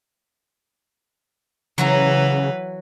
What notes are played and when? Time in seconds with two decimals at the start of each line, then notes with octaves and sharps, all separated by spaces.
1.78 C#3 E3 F#3 F#4 B4 A#5